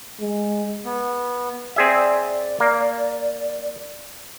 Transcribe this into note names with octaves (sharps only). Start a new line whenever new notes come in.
G#3
B3
C4 G#4 D5 E5
A#3